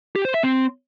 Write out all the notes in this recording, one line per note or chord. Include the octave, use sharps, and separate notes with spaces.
G4
C5
E5
C4